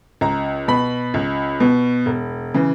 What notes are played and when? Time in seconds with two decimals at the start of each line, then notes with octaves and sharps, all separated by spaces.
0.21 C#2 A#5
0.68 B2 B5
1.14 C#2
1.60 B2
2.06 E1
2.54 C#3 E3